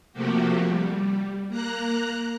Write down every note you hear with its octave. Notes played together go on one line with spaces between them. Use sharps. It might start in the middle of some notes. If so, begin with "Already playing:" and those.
C3 F3 A3 A#3 F#4 G4
G3
A#3 A#5 F#6